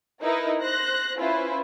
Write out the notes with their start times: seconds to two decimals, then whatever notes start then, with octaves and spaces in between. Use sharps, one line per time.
0.21 D#4 E4 A#4 B4 D#5
0.60 C5 F#6 A#6
1.17 C#4 E4 F4 B4 C5